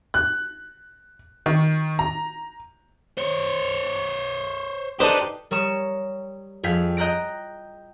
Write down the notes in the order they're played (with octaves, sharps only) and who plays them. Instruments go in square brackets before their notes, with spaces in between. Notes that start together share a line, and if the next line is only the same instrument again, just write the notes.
[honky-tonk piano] F#6
D#3
A#5
[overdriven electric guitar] C5 C#5
[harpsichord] D4 D#4 B4 [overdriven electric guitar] G4 [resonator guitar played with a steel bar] A4 C5
[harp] G3 A#4 C#5 D#6 E7
F2 G#4 F5 G5 B6
D#5 G5 A#5 F#6 A#6 D7